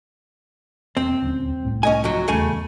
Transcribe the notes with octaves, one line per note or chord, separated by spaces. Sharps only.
E1 C4
D#1 D2 C#4
C2 A2
C#4 D#5 G#5
F2 G#2 F#3
D#1 E2 C#3 A3 G#5